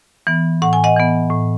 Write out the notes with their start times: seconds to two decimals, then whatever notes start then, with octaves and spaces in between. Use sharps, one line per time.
0.27 E3 B3
0.62 A2 F#5
0.73 G#5
0.84 D#5 F#5
0.96 E3 B3
1.31 A2